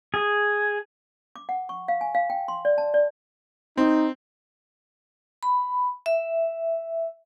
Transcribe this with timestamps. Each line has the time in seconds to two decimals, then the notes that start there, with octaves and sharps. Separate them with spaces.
0.14 G#4
1.36 D6
1.49 F#5
1.69 C#6
1.88 F5
2.01 G#5
2.15 F5
2.30 G5
2.48 C6
2.65 D5
2.78 A5
2.94 D5
3.77 C4 D#4
5.43 B5
6.06 E5